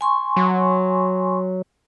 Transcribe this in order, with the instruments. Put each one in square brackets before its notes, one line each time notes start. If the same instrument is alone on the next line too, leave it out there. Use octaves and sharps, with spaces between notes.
[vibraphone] G#5 C6 C#6
[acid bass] F#3